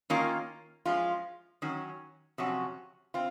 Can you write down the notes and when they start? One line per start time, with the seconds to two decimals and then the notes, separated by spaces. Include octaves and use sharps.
0.10 D#3 A#3 C#4 F4
0.86 F3 G#3 C#4 F4
1.62 D#3 F#3 C#4
2.38 F2 C3 F#3 C#4 F#4
3.14 C4 F4